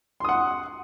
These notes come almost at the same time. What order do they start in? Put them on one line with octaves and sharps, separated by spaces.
C6 D#6 F#5